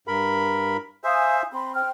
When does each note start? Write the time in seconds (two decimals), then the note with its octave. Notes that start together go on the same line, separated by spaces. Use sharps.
0.08 G2 A#4 B5
1.04 C5 E5 F5 G#5 D#6
1.53 C4 B5 C6
1.75 C5 G5 F6